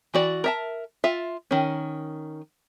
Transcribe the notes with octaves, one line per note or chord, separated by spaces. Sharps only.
E3 F#4 D5
A#4 E5 A5
F4 E5
D#3 C#4